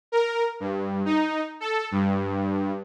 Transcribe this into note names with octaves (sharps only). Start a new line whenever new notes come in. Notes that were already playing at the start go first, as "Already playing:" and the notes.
A#4
G2
D#4
A4
G2